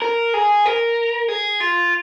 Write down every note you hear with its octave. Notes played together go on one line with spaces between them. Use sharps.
A#4
G#4
A#4
G#4
F4